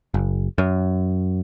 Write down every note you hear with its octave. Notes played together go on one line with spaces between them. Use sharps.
F#1
F#2